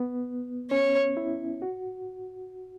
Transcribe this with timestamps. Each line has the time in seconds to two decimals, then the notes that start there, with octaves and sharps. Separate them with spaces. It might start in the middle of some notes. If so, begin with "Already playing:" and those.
Already playing: B3
0.71 C#4 C#5
1.17 E4
1.62 F#4